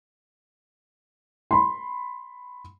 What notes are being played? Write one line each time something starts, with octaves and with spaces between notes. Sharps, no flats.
B5 C6